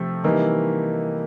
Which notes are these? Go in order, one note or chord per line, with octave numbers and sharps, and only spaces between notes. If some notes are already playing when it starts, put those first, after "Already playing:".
Already playing: C3 F3 A3 C4
C3 E3 G3 A#3 D#4